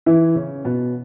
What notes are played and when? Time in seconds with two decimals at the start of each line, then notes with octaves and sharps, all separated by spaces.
0.06 E3 E4
0.35 C#3 C#4
0.65 B2 B3